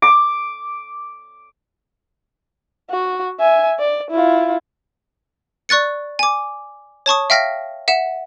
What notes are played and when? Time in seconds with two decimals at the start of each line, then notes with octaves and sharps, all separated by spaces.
0.02 D6
2.90 F#4
3.40 E5 G#5
3.79 D5
4.10 E4 F4
5.69 D5 C#6 F#6 A6 C#7
6.19 G#5 D6
7.06 C#5 A5 C#6 D#6
7.30 E5 F5 G5 F6 A#6 B6
7.88 E5 F#5 E7